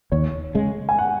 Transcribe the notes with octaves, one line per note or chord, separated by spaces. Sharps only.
D#2 C#5
C#3 G#3
G#5
F#5